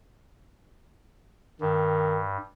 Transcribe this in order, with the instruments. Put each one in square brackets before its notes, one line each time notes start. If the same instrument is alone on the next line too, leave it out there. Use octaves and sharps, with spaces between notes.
[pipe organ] G2 [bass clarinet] D#3